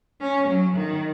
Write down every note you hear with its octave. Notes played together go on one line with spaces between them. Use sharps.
C#4
F#3
D#3